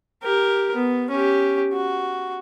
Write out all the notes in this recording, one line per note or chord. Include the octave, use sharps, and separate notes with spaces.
G4 A#4
B3
C#4 G4
F#4